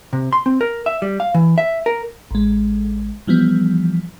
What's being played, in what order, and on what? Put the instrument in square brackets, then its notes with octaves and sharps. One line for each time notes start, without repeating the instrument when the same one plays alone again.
[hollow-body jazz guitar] C3
C6
C4
A#4
E5
G3
F5
E3
E5
A#4
[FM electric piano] A1 G#3
E3 F3 G3 B3